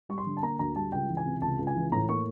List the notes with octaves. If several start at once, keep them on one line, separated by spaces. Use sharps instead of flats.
G3 C#6
C6
D3
A5
A#3 A#5
D2 A#5
G3 A5
C#2 G5
E3
G#5
C3
C#2 A5
C#2
G#5
E3
A2 A#5
A#3 C#6